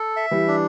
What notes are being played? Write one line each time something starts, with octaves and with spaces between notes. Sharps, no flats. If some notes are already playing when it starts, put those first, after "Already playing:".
Already playing: A4
E5
E3 G3
D4